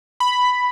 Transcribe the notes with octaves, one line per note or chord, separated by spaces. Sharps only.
B5